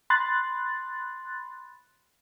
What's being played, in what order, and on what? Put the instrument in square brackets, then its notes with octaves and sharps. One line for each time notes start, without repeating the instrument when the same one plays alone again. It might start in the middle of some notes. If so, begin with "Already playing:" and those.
[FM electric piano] B5 C6 F#6 A6